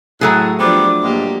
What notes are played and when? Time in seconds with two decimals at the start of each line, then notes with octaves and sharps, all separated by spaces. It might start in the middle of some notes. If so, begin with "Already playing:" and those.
0.21 A2 F#3 A3 G#4 F#6
0.60 F3 G3 B3 C4 D4 D6
1.03 G2 G#3 A#3 G4